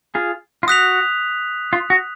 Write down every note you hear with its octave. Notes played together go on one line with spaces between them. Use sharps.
F4 G#4
F4
F#4 D#6 F#6 B6 F7
F4
F#4